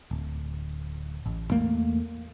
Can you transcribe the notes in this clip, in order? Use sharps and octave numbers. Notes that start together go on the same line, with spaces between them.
D1
A1
E2 A3 A#3